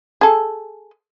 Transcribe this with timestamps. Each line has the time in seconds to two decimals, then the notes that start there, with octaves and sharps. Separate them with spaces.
0.21 G#4 A4